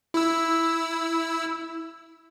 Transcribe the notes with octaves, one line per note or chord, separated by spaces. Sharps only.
E4 E6